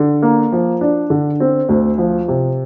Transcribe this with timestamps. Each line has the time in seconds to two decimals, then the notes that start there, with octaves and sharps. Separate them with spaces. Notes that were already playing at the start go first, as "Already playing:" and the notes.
Already playing: D3
0.22 A#3
0.52 F3
0.81 D4
1.10 D3
1.40 C4
1.69 D2
1.98 F3
2.28 C3